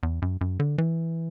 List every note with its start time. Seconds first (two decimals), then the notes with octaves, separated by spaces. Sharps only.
0.03 E2
0.22 F#2
0.41 F#2
0.60 D3
0.78 E3